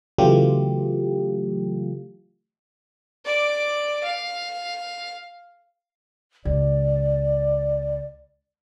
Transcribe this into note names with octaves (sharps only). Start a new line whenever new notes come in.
C#3 E3 F#3 A3 F4 G4
D5 D6
F5
C#2 D5